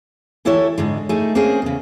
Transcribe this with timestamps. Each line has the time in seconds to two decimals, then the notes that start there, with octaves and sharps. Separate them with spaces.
0.45 D2 E3 E4 G4 A4 C#5
0.78 G#2 D3 G#3
1.09 A3 D#4 G#4
1.35 A#3 C4 C#4 G#4
1.62 E2 C#3